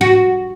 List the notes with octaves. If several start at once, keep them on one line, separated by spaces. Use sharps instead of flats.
F#4